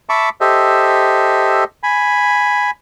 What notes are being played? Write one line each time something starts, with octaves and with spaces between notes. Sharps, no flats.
E5 A5 B5 C#6 D6
G4 A4 C5 D#5 E5
G#5 B5